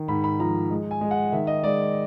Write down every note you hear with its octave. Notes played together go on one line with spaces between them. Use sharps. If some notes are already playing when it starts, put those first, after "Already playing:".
Already playing: D#3
G#2 B5
B5
F3 A#5
G#3
G#5
G#3
F#5
D#3 E5
D#5
G#3 D5